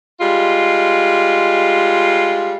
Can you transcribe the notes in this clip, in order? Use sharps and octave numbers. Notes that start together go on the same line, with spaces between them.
G3 G#3 F4